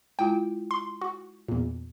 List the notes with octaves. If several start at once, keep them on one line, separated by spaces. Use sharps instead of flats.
G#3 E4 F4 G5
C6
F#4
E2 A#2